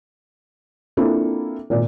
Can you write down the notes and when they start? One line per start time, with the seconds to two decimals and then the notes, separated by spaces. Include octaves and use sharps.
0.97 A#3 C4 D4 E4 F4 A4
1.70 G#1 A#2